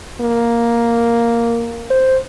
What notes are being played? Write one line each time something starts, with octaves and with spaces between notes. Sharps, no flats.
A#3
C5